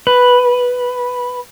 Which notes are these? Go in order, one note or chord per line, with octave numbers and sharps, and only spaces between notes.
B4